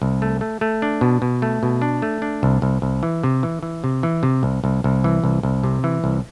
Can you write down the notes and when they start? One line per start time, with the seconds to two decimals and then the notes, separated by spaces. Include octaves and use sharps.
0.02 C2
0.22 A3
0.41 A3
0.61 A3
0.82 D4
1.01 B2
1.22 B2
1.42 A3
1.63 B2
1.82 D4
2.02 A3
2.22 D4
2.43 C2
2.62 C2
2.82 C2
3.03 E3
3.23 C3
3.43 E3
3.63 E3
3.84 C3
4.03 E3
4.23 C3
4.43 C2
4.64 C2
4.84 C2
5.04 E3
5.24 C2
5.43 C2
5.63 C3
5.84 E3
6.04 C2